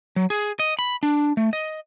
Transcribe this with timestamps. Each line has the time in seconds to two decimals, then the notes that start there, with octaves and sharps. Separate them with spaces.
0.16 F#3
0.30 G#4
0.59 D#5
0.79 B5
1.03 D4
1.37 A3
1.53 D#5